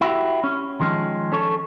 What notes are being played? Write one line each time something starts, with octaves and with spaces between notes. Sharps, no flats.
E4 F#4 G4
C#4
D#3 F3 G#3 C#4
C#4 A4 C#5